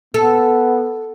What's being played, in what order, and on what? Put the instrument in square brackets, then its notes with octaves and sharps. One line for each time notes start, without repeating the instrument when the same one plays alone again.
[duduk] B3 [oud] A4